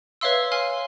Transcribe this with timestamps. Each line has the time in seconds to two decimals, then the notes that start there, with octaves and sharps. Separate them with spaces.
0.21 B4 C#5 E5 F5 C6 E6
0.52 F5 G#5 C6 F6